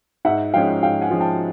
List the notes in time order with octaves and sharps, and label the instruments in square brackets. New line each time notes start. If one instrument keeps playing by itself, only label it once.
[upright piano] G#2 E5 F#5
F3 G#3 C#4 F5 G5
G#2 F5 G5
F#5 G#5
F3 G#3 C#4
G5 A5